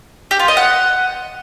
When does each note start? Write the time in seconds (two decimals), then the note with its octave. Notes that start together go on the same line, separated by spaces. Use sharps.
0.31 G4
0.40 F4
0.48 D#5
0.57 F#5